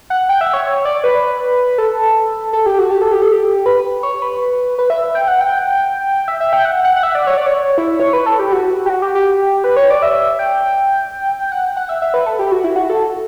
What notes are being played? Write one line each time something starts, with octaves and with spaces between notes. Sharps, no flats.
F#5
G5
E5
C#5
C#5
D5
B4
A4
A4
G4
F#4
G4
A4
G4
A4
G4
B4
C#5
B4
B4
E5
G5
F#5
G5
E5
E5
G5
F#5
F#5
F#5
E5
D5
C#5
D5
C#5
E4
C#5
B4
A4
G4
F#4
G4
F#4
G4
G4
B4
C#5
D5
E5
G5
F#5
F#5
E5
E5
B4
A4
G4
F#4
E4
F#4
A4